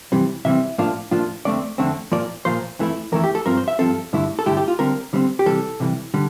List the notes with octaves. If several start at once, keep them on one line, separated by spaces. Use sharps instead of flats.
C3 E3 G3 C4
C3 E3 G3 C4 E5
A2 F3 A#3 D4 F4
A2 F3 A#3 D4 F4
F2 D3 A3 C4 D5
F2 D3 A3 C4
A#2 F3 A#3 D5
A#2 F3 A#3 C5
F2 E3 A3 E4
F2 E3 A3 E4 A#4
G4
A4
G2 F3 C4 A#4
C5
E5
G2 F3 C4 A4
G2 D3 A3 E4
A4
G2 D3 A3 E4 G4
G4
F4
D3 G3 C4 A#4
D3 G3 C4
G4
C3 E3 G3 A4
C3 E3 G3
D3 G3